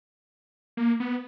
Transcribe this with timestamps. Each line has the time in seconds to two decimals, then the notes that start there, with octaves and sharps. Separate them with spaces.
0.77 A#3
1.00 B3